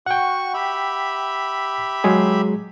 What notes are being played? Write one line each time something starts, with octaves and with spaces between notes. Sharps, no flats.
F#4 F#5 G5 C#6
G4 E5 B5
F#3 G#3 G#4